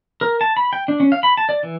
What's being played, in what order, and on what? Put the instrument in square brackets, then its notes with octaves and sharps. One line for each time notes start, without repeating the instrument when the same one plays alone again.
[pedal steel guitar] A#4
A5
B5
G5
D4
C#4
F5
B5
A5
D5
E3